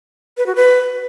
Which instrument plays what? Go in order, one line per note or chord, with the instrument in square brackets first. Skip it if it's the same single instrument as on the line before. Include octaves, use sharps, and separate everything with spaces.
[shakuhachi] B4
F#4
B4